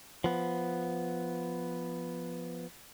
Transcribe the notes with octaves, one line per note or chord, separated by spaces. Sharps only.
F3 B3